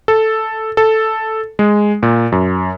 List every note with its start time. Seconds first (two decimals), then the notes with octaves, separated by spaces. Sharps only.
0.08 A4
0.77 A4
1.59 G#3
2.03 A#2
2.32 F#2